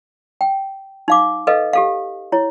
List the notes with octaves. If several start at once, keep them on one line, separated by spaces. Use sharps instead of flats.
G5
D#4 F5 D6
A4 B4 D#5 F5
G4 A4 F5
E4 C#5